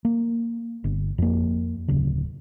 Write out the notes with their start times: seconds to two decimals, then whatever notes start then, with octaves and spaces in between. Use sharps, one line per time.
0.05 A#3
0.84 G1
1.18 F2 A#3
1.88 D1 C#3